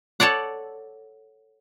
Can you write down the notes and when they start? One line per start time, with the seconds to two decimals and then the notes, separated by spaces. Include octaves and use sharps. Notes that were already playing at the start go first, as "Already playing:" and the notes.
0.20 A4 C#5 D5 F#5